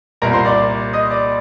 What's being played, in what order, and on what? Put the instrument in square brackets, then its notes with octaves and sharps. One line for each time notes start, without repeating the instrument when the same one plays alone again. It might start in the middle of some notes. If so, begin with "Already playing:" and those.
[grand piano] C2 A#2 G3 A#4 A#5
C5 C6
D5 D6
D#5 D#6
D5 D6